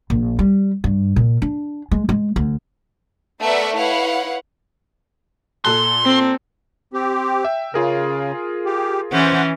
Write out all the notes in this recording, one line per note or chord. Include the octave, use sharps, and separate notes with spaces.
A#1
G3
G2
A#2
D4
G#3
G#3
D2
A3 B3 A#4 D5 E5 F#5
E4 B4 C#5 F5 F#5
A#2 A4 C6 F#6
C4
C4 G4
E5 G5
C#3 F4 G#4 A#4
G4
E3 C#4 C5 F#5